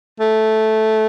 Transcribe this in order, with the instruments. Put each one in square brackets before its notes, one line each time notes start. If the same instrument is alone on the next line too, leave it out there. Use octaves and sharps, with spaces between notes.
[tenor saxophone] A3